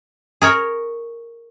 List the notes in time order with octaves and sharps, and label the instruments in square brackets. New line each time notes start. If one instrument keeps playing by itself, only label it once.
[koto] G#4 A#4 C#5